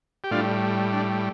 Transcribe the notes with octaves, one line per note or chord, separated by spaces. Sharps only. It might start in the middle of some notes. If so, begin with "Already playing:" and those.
G4
A2 G3 D4 F4
D4